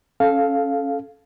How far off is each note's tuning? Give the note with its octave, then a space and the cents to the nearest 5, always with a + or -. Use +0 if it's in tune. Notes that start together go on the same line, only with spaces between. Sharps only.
C#4 -10 A4 -15 F5 +0